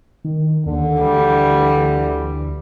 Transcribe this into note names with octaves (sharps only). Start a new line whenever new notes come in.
D#3
D#2 D3
D2 E3 G3